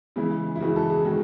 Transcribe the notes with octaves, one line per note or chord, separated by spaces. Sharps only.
C#3 E3 G#3 E4
E4
C#3 E3 G#3 F#4
A4
G#4
D#3 G#3 F#4